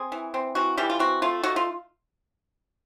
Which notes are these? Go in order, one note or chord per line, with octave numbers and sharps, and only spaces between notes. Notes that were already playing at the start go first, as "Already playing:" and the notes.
Already playing: C4 G#4
E3
C4
E3 F#4
E3 G3 G4
F4
C4 F#4
A3 F4
D#4 F#4
F4